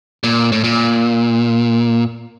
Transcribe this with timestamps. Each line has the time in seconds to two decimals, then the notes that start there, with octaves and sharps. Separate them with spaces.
0.24 A#2
0.52 A2
0.64 A#2